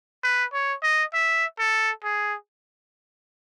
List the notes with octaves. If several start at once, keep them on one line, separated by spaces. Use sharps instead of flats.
B4
C#5
D#5
E5
A4
G#4